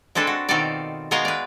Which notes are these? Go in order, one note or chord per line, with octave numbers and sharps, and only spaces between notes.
G#3 C4 D4 A4 B4
F#4
B2 D#3 C4 F4 A4 D5
G#3 B3 F#4 A#4 D#5 F5
B4 D5